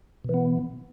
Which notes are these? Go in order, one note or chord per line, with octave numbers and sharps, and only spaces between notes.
B2 E3 B3